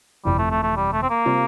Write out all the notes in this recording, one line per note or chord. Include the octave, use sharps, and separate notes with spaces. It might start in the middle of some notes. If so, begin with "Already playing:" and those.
G1 F2 C3 E3 G3
A3
A3
A3
G3
A3
C4
A#3
C3 G3 C4 F4